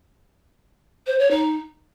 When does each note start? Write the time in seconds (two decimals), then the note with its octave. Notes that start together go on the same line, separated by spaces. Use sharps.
1.07 C5
1.19 C#5
1.31 D#4